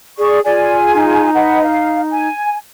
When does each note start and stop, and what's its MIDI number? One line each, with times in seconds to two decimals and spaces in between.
0.18 0.41 68
0.18 0.39 74
0.18 0.39 85
0.45 1.30 65
0.45 1.30 68
0.45 0.76 74
0.45 1.30 80
0.94 2.28 63
1.34 1.62 71
1.34 1.62 75
1.34 1.62 78
1.63 2.01 77
2.10 2.57 80